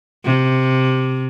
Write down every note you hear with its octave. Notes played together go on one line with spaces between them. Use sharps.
C3